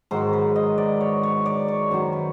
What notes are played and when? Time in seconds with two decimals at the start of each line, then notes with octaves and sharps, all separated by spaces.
0.11 G#2 D#3 F#3 C5
0.33 B4
0.56 D#5
0.78 D5
1.01 C#5
1.23 C#5
1.46 D5
1.68 C#5
1.90 F#2 D#3 F#3 C5
2.13 B4